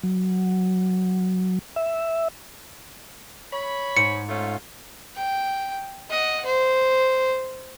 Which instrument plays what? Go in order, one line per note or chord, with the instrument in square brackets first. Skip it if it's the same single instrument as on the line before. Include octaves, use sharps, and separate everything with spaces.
[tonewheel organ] F#3
E5
[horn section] C#5 B5
[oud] G#2 [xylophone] C#7
[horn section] A3 C#4 F4
[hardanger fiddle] G5
D#5 F#5
C5